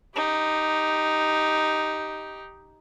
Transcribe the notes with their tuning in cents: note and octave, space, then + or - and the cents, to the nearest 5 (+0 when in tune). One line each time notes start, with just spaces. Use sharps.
D#4 +0 G4 +0